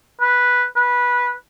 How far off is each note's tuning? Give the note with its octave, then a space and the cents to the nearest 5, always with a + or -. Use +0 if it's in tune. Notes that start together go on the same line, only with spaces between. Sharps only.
B4 -5
B4 -15